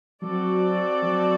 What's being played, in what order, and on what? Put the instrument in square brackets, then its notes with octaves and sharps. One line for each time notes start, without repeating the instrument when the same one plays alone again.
[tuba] F#3 [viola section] C4 F#4 A4 D5
[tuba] F#3